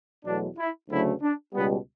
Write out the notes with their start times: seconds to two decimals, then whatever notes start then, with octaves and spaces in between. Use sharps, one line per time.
0.24 E2 B2 F#3 A3 D4
0.57 E4
0.90 D2 C#3 F#3 A3 E4
1.22 D4
1.54 C#2 B2 G3 B3